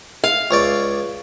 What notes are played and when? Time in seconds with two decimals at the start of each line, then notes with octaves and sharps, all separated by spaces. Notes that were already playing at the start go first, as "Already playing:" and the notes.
0.24 F5
0.51 C#2 C#5 D5